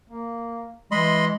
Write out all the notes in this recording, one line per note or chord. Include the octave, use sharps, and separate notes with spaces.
A#3
E3 G#3 D#5 B5 C6